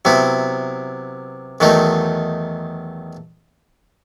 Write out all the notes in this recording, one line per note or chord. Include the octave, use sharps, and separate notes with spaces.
C3 F#3 B3 E4
E2 D#3 F#3 A3 D#4